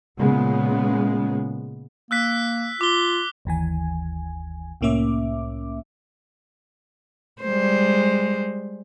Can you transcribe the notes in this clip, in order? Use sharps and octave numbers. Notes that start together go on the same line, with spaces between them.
A#2 C#3 G#3 B3
A#3 E6 F#6 B6
F4 D6 G7
G1 D#2 E3 G#5
C2 A2 A#3 C#4 E5 D6
G3 G#3 C5